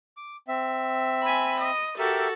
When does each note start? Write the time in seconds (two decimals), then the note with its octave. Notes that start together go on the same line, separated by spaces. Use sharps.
0.17 D6
0.48 C4 E5
1.22 G#5 B5
1.61 D#5
1.99 F#4 G4 A4 A#4 E5